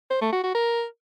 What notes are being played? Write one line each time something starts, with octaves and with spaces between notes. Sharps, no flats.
C5
A3
F#4
F#4
A#4